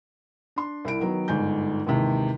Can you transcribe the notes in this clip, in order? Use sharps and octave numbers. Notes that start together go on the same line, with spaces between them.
D4 C6
C2 E4 D7
D#3 F#3 B3
G1 G#2 G#5 G6
D#2 G#2 C3 E3